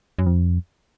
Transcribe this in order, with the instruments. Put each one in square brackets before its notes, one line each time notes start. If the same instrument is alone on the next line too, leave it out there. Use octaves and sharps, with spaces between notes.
[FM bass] F#2
F2